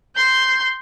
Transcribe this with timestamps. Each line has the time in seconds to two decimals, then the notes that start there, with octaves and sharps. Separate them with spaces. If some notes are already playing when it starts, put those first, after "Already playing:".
0.16 C6 G6